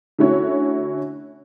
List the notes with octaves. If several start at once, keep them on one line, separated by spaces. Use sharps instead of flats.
D3 A3 C#4 E4 F#4 C#5